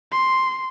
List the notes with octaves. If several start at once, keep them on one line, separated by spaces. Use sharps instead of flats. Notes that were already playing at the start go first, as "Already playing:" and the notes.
C6